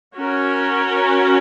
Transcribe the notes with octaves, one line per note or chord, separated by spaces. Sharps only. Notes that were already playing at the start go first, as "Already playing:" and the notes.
C#4 F#4 A#4